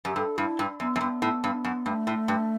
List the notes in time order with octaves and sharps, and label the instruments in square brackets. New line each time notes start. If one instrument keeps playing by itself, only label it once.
[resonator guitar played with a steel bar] F#2 [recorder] G4
[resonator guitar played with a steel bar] G2 [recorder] A4
[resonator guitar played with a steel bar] G2 [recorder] E4
[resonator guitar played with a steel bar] G2
[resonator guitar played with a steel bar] F#2 [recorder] B3
[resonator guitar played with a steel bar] F#2
[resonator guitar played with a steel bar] G2 [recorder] B3
[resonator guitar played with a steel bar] A2
G2
F#2
[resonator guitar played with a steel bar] G2 [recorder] A3
[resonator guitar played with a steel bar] A2
G2